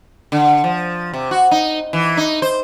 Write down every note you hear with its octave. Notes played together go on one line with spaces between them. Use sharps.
D3
F3
C3
F#4
D#4
E3
D#4
C5